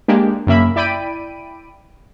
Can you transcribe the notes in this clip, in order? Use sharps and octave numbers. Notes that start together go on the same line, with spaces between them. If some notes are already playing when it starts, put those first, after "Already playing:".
G#3 A#3 D4 G4
F#2 C#3 A#3 E5 B5
E4 D5 G5 B5 D7 D#7